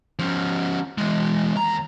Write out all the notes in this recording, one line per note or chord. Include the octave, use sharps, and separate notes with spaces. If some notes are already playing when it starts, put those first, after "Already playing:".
F3 C#4
E3 G#3
D#2 A#5